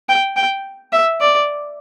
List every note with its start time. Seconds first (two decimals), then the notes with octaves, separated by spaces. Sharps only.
0.09 G5
0.36 G5
0.93 E5
1.21 D5